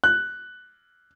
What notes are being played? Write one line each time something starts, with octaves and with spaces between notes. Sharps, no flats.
F#6